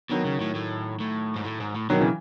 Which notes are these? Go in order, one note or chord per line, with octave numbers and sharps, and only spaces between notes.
B2 D#3 F#3
C#3
A2
A2
A2
G#2
A2
G#2
A2
B2 D#3 F#3
C#3 E3